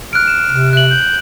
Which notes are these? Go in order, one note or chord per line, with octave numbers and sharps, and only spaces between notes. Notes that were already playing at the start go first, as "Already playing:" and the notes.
F6 F#6 D7
E7
C3
E5 F#6 F#7
G6